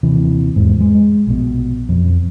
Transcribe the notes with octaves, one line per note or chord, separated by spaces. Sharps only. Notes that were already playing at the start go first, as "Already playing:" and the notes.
D#2 C3 E3
E2 G#2
G#3
A#1 B2
F2